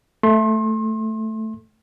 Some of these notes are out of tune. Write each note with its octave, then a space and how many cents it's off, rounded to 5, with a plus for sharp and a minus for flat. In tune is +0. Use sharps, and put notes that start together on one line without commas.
A3 +0 C6 +35